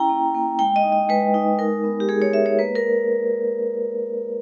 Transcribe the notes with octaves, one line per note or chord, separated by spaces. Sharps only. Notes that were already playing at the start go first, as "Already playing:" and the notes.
Already playing: C#4 E4 G5 A#5
A#3
A#3
G#3 G5
D#5
D#4
D#5
G#3 B4
D#4
D#4 A#4
B3
G4
G#3 G#4
C#5
G#3 E5
C#5
A#3 B4
A#4